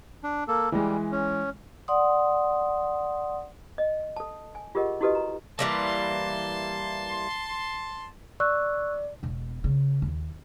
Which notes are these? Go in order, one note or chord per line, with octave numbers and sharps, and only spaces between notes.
D4
A#3 A4
E3 G3 G#3
C#4
D5 F#5 C6 D#6
D#5
A4 A5
G#5
F4 G4 G#4 A#4 D#5 F#5
E4 F#4 G4 A4 B4 D#5
A#5
E3 G3 A#3 A5 C6
D5 C#6 E6 F#6
E1 B2
C#3
D#2